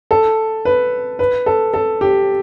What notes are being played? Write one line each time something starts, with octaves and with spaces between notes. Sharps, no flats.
A4
B4
B4
A4
A4
G4